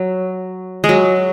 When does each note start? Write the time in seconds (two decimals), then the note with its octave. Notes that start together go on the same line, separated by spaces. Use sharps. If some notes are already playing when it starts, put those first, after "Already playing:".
Already playing: F#3
0.84 G#3
0.89 F#3